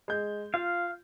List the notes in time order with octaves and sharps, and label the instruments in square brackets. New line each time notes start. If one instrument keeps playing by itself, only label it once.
[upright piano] G#3 G6
[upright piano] F4 [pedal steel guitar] F5